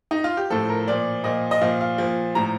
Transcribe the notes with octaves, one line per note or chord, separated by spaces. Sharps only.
D#4
F4
G4
A2 F3 A4
A#4
A#2 F3 D5
A#2 F3 D#5
D#5
A#2 F3 F5
F5
A#2 F3
A2 F3 A#5